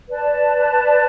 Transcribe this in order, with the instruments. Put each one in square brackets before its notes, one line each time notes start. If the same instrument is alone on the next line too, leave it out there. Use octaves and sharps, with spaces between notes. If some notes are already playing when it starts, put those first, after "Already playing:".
[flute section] B4 D5 A5